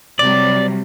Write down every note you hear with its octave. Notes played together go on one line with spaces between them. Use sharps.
C3 F#3 G3 D5